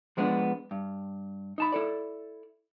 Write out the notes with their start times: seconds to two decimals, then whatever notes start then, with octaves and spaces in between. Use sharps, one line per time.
0.17 F3 G#3 B3 C#4 D4
0.71 G2
1.58 D#4 A5 B5
1.72 E4 A4 D5